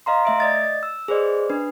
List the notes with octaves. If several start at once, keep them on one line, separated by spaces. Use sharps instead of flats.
D#5 F5 A#5 C6
A3 E5 D7
D5 D#5 A6
E6
G#4 B4 C5 D5 D#5
D4 B4